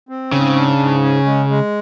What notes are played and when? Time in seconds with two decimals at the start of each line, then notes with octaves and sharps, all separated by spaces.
0.09 C4
0.32 G#2 C#3
0.56 D4
0.79 G#2
1.03 C#4
1.26 G#3
1.49 G#3